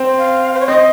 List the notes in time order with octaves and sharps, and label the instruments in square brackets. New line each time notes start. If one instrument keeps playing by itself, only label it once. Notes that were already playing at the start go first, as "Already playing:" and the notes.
Already playing: [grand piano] C4
[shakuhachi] F5
C5
C#5
[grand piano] C4 [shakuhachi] D#5